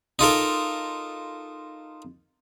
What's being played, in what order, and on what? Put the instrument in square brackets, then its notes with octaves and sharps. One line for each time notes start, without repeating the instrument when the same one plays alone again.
[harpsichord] D#4 F4 A4 A#4